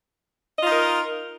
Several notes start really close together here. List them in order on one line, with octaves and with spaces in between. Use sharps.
D#5 F4 D#4 A#4